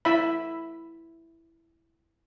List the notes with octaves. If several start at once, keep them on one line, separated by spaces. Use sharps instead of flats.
E4 E5 B5